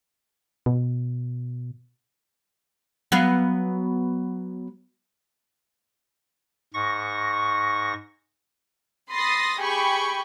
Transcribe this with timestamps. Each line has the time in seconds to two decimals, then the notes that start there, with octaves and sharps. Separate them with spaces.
0.66 B2
3.12 F#3 B3 F5
6.74 G#2 C#6 A#6
9.11 B5 C6 D#6 A6 A#6 C7
9.59 G4 G#4 G5 G#5 B5 C#6